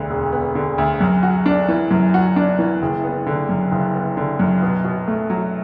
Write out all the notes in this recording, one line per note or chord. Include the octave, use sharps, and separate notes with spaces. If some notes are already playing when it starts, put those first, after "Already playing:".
Already playing: E1 D2 D3
E1
B3
D3
D2
F#2
F#4
D4
E3
F#2
F#4
D4
E3
F#1
B3
D3
F#2
F#1
B3
D3
F#2
B2
B2
A3
F#3